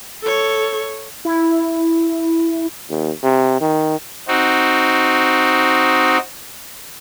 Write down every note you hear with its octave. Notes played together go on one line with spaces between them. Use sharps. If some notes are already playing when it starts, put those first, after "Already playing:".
A4 C#5
E4
D#2
C3
D#3
C4 D#4 F#4